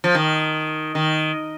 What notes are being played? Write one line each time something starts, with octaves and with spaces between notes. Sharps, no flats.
F3
D#3
D#3